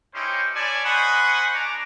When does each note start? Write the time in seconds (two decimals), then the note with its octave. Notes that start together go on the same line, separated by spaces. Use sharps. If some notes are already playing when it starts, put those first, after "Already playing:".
0.14 C#4 D#4 E4 G4 C5
0.55 C#4 E4 C#5 D5 G#5 A5
0.84 C5 D#5 F#5 G#5 B5 C#6
1.54 G#3 D4 G#5 A#5 D6